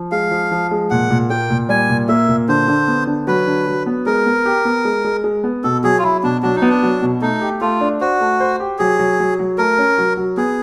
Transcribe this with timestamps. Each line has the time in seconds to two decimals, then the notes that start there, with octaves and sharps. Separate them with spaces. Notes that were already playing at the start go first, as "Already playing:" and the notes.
Already playing: F3
0.12 G#3 F5
0.31 F3
0.52 F3
0.71 G#3
0.90 A#2 F#5
1.10 A#2
1.30 A#3 G5
1.50 A#2
1.69 G3 G#5
1.89 A#2
2.09 A#3 E5
2.28 A#2
2.49 D3 C5
2.68 D3
2.88 B3
3.07 D3
3.27 F#3 B4
3.47 D3
3.67 F#3
3.86 B3
4.06 G#3 A#4
4.26 B3
4.45 G4
4.65 B3
4.85 G#3
5.04 G#3
5.24 G#3
5.44 B3
5.64 B2 A4
5.84 F#3 G#4
5.99 F4
6.03 F#3 E4
6.23 B2 D4
6.43 F#3 D4
6.56 D#4
6.62 B3
6.69 D4
6.83 F#3
7.02 B2
7.22 A3 D#4
7.41 G4
7.61 A3 F4
7.81 D4
8.01 F#4 C5
8.20 A3
8.40 C5
8.60 G4
8.79 F#3 G#4
8.99 F#3
9.19 F#3
9.39 F#3
9.58 A3 A#4
9.79 C#4
9.98 F#3
10.17 F#3
10.37 B3 G#4